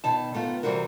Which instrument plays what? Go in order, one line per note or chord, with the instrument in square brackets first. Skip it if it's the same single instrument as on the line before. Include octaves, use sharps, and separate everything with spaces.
[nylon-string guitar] B2 D#3 A5
D#3 A3 B3 F4
C3 E3 G3 C4 F#4 A#4